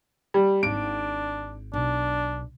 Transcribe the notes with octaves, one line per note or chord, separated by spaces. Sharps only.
G3
G#1 D4 D7
B1 D4